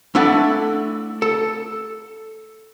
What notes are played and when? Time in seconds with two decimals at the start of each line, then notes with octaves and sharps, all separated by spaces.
0.15 A3 D4 E4 A4 F#5 G#5
1.22 A4